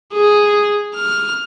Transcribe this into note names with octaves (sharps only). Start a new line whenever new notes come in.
G#4
F6